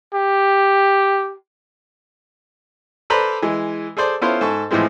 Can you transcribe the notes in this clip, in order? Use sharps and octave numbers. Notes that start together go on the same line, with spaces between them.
G4
A4 B4 C5 D5 A#5 B5
E3 G#3
G#4 A4 C5 D5
B3 C#4 E4 F4 A4 C5
G#2 A4 C#6
A2 E3 F3 G#3 C4